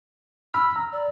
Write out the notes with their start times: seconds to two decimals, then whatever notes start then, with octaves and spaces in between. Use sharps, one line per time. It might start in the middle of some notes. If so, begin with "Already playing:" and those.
0.54 B5 E6 F6
0.76 A#5
0.92 D5